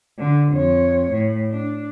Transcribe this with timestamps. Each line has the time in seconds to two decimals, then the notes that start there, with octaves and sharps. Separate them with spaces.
0.19 D3
0.53 F2 C#5
1.12 A2
1.51 D4